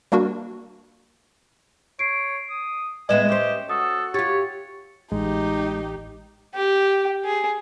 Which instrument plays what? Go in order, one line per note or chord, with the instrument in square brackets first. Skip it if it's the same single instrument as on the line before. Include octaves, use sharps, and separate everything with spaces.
[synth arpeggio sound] G3 A#3 D4 F#4 A#4
[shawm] C#5 [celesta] C7 D7
[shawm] D#6
[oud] A2 G#3 B3 [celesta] B4 E5 E7 [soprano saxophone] D#5 [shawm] G#5
[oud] C#4 C5 [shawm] G4
[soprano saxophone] F#4 [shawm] A4 [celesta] D#6
[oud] F4 G4 [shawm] C#5 [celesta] A6
[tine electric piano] A1 [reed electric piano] G#3 [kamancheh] D#4 G4
[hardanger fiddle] G4
G#4